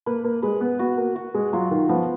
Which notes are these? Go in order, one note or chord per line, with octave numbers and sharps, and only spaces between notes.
A#3 B4
A#3
G#3 B4
B3
B3 F#4
A#3
F#4
G#3
F#3 F4
D#3
F3 B3